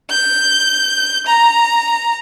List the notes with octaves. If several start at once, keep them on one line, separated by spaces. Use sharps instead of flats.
G6
A#5